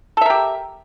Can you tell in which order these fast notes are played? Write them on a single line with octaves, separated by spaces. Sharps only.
A4 E5 A#4 G4